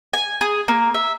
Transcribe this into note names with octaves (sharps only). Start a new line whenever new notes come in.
G#5
G#4
A#3
E5